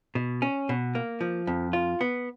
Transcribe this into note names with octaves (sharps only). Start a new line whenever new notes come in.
B2
C#4
B2
A#3
F3
F2
F4
B3